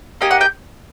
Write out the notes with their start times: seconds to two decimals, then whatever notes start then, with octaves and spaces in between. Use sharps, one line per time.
0.21 A#3 D#4 G4 G#5
0.31 F#5
0.41 G5